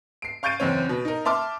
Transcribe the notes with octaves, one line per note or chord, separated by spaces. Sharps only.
C7 D7
F5 C#6 G6 A6 D7 D#7
F#1 E2 C4 C#5
B2
D#4 A#4
E5 A5 C6 D6 F6